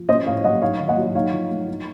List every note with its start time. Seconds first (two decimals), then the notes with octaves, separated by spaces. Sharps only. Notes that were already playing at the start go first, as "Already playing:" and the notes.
Already playing: F3
0.09 C#4 C5 D#5
0.26 A2 C#5 F5
0.44 F#3 D#5 F#5
0.62 D#4 C#5 F5
0.80 D#3
0.88 D#5 F#5
0.97 F#3
1.15 D#4 C#5 F5
1.33 F3
1.51 A3
1.68 D#4